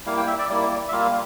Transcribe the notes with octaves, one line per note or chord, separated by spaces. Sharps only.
G3 A#3 E4 F5
G5
E5
D5
G3 A#3 E4 D5
E5
G3 A#3 F4 F5